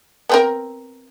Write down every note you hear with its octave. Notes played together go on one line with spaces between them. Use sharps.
B3 C4 A#4